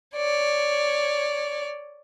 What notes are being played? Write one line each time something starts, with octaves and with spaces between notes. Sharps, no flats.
C#5 D5